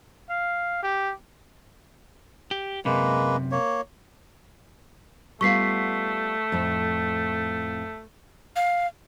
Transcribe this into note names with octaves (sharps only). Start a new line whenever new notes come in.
F5
G4
G4
F#2 C3 G#3 A#3 B4
A#3 C#5
G3 A3 B3 F4 C#6 B6 C7
F2 A2
F5